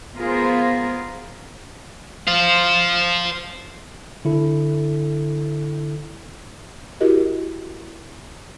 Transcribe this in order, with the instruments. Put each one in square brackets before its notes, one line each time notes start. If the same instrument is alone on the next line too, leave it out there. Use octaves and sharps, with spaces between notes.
[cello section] B3 F4 G#4 A#4 C5
[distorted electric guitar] C5 F5
[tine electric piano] D3 E4 A4
[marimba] E4 F#4 G4 A#4 D#5